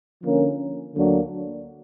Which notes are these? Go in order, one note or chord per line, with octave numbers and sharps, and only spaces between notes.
D3 F3 A#3 C#4
D2 D3 F#3 A#3 D4